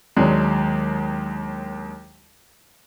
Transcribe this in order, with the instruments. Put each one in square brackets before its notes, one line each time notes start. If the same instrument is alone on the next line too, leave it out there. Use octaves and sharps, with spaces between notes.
[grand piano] D#2 F#3 G#3 D4